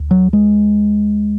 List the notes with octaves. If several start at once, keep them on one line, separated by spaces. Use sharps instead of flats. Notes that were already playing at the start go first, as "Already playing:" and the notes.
Already playing: D2
F#3
G#3